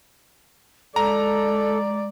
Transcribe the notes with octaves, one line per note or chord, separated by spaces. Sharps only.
G#3 A4 D5 A#5